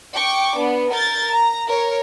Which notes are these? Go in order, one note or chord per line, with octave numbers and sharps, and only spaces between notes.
G5 C#6 D6
B3 D4
A#4 G6 A6
A#5
A#4 C#5